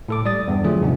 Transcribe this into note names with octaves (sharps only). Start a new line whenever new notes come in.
A2 A4 D6
G3 D5 D#6 A6
E2 G2
D3 F3 F#3 A3 F4 G#4
E2 G#2 C3 G#3 D4